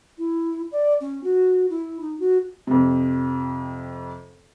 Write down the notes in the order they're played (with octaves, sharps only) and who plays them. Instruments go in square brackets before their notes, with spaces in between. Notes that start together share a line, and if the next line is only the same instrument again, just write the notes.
[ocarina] E4
D5
C#4
F#4
E4
D#4
F#4
[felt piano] F2 C3